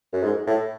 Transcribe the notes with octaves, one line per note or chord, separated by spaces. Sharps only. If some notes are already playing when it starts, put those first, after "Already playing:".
F#2
G#2
A2